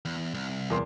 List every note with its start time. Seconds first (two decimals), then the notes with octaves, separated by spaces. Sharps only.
0.05 E2
0.34 C2
0.70 E2 A#4 C6